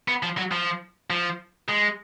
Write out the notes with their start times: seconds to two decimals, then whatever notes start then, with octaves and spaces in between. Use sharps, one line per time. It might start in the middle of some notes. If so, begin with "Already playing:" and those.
0.08 B3
0.23 F3
0.37 F#3
0.52 F3
1.10 F3
1.68 G#3